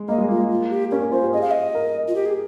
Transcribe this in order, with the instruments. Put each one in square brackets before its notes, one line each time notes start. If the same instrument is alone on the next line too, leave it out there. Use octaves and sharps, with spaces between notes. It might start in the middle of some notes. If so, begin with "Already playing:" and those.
Already playing: [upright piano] G#3
[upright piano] A#3 [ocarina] D#5
[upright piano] G#3
[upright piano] A#3 [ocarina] F4
[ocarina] F4
G4
[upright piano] C#4 [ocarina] A#4
[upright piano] C#4
[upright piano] F4 [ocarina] C5
[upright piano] G4
[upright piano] G#4 [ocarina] D#5
[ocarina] F5
D#5
[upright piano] A#4
[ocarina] F4
G4
G#4